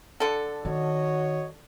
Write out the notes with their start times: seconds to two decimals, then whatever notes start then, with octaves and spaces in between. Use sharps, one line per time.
0.20 D3 A4
0.65 D#3 F#4 C#5 D#5